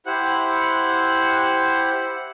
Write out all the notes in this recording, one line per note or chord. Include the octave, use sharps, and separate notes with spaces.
E4 G4 C5 F#5 F#6